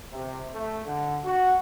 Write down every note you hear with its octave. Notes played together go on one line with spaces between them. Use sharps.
C3
A3
D3
F#4